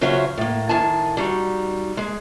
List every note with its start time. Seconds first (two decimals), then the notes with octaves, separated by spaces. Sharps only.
0.01 C#3 F#3 F4 C5 C#5 E5
0.38 A2 A#3
0.69 A2 D#3 G#5 A5
1.17 G3 D#4 F#4
1.97 G#3 G#4